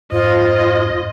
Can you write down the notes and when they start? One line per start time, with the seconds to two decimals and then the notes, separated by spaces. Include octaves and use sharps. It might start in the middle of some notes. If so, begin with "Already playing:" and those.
0.12 F2 G#2 F4 C5 D#5